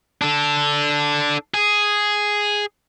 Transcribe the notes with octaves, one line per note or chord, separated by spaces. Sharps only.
D4 A4
G#4